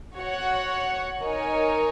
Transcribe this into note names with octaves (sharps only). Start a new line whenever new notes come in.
F#4 C#5 F#5
D#4 A#4 C#5 G#5